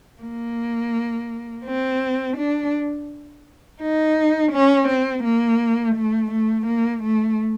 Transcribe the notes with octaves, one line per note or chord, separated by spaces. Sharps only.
A#3
C4
D4
D#4
C#4
C4
A#3
A3
A3
A#3
A3